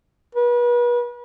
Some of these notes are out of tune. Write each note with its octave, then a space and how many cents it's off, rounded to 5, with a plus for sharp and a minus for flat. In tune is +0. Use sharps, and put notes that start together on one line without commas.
B4 -35